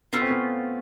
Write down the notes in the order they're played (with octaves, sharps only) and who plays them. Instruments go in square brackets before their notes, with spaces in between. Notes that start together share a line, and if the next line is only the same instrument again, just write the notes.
[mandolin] A3 C#4 F4 [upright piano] B3
[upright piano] C4
B3